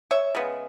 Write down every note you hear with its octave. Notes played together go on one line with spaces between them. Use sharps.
C#5 E5
C#3 G#3 B3